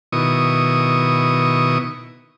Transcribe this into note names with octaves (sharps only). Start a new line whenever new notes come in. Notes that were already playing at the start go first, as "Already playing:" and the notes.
B2 D#3 E4 C#6 D#6